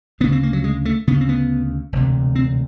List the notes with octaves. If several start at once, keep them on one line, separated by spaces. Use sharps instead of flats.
D2 C#3 B3
C4
A#3
F#3
G#3
A3
D2 C#3 B3
C4
B3
E1 D2 C3
C4